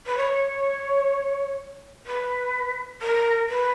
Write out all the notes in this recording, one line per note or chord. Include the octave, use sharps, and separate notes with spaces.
B4
C#5
B4
A#4
B4